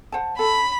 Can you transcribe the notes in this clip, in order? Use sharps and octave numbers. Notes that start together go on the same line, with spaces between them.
C5 F#5 A5
A4 B5